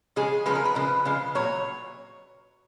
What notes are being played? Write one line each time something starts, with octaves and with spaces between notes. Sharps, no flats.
C#3 F3 G#3 G#4
C#3 F3 G#3 B4
A#4
B4
C#3 F3 G#3
C#3 F3 G#3
A#2 F#3 C#5